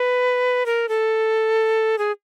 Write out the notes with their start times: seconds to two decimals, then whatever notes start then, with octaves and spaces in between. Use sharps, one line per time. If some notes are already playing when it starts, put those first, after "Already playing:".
Already playing: B4
0.66 A#4
0.89 A4
1.98 G#4